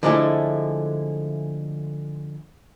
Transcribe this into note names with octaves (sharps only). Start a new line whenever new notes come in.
D3 F3 G#3 A3 E4 A4